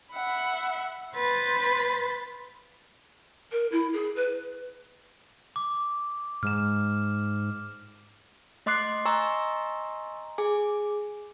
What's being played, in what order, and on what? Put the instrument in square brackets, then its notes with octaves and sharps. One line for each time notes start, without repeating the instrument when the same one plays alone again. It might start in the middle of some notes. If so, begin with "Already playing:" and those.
[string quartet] E5 F#5 B5
B4 C5 C6 A6
[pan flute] A#4
E4
G#4
B4
[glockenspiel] D6
[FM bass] G#2 [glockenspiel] F6 E7
[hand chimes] A3 D#5 C6 D6 F#6 C7
D#5 G#5 A#5 C6 C#6 E6
G#4 G#5 D6